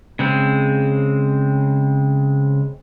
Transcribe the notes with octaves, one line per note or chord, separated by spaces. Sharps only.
C#3 G#3 C4